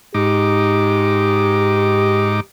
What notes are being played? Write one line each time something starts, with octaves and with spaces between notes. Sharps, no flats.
G#2 D#4 G4 D6